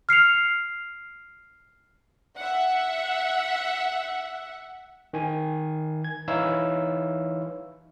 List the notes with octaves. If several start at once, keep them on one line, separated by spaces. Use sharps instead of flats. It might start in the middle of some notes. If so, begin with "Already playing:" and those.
F6 C7 C#7 F7
E5 F#5
D#3 G#5
G#6
E3 D#4 E4 C#5 F5 E6